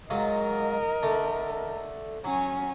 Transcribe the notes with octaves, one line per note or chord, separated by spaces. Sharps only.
G#2 F#3 F4 A#4 D#5
D3 A3
F#3 C#4 G#5